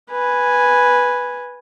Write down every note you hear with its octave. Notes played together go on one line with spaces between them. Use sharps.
B4 G#5